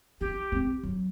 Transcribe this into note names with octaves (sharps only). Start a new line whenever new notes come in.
D#4 G4
C4
F#3